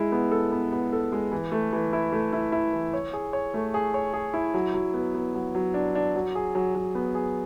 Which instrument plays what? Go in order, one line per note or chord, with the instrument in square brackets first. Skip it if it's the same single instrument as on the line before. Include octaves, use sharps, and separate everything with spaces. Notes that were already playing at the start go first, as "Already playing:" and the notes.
Already playing: [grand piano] G#3 E4
B3
A4
B3
B3
A4
G#3
E3
A3
E3
E4
A3
E4
E4
E3
C#5
G#4
C#5
A3
G#4
C#5
G#4
E4
F#3
F#3
B3
B3
F#3
F#3
D4
D4
F#3
G#4
F#3
F#3
B3
G#4